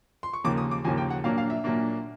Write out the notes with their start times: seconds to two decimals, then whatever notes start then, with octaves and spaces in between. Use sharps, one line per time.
0.23 C6
0.33 C#6
0.44 D#2 C#3 F3 A#3 D6
0.58 D#6
0.71 D6
0.84 D#2 C#3 F3 A#3 G#5
0.98 G5
1.10 F#5
1.24 A#2 F#3 A#3 D4 F5
1.38 F5
1.50 E5
1.64 A#2 F#3 A#3 D4